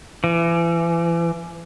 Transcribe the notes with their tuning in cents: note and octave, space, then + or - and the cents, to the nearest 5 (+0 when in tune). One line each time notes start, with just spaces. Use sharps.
E3 +35